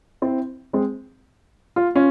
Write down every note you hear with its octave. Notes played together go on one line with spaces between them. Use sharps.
C4 E4
G#3 C4
F4
C#4 F4